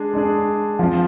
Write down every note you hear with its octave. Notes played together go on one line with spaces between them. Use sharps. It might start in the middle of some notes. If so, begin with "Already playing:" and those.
Already playing: G#3 D4 G#4
G#3 D4 G#4
F3 C4 F4